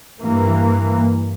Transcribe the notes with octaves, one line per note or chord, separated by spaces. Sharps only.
G2 E3 A#3